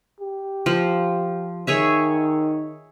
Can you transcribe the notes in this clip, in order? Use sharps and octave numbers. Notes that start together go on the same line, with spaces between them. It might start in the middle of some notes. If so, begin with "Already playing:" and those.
G4
F3
D#3 G#4 C#5 E5